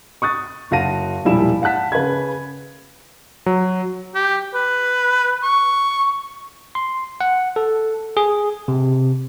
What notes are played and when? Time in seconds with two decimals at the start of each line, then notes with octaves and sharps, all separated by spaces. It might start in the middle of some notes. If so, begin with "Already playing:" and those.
0.22 C#6 D#6 F#6 A6
0.71 F#1 F#4 F5 A5 A#6 D#7
1.25 E1 A#2 F3 G3 E4 E7
1.62 F5 F#5 A5 F#6 B6
1.92 C#3 B4 B5 G#6
3.46 F#3
4.15 G4
4.54 B4
5.43 C#6
6.75 C6
7.21 F#5
7.56 A4
8.17 G#4
8.68 C3